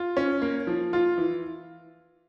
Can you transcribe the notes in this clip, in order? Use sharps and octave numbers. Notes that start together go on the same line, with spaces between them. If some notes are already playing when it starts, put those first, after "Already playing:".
Already playing: F4
C#4
A#3
F3
F4
E3